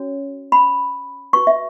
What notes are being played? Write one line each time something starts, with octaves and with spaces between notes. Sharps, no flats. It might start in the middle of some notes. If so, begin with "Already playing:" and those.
Already playing: C#4 F#4 C#5
B5
F#4 B4 C#6
E5